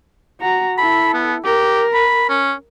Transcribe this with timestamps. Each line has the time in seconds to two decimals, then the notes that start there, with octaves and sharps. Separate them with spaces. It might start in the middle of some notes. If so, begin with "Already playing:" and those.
0.41 F#4 A#5
0.78 E4 A4 B5
1.14 B3
1.45 G4 A#4
1.94 B5
2.29 C#4